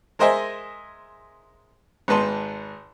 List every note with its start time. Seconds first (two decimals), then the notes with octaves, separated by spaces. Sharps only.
0.19 G#3 A#4 C5 D#5 E5 G#5
2.08 G#1 G#2 B4 A5 C6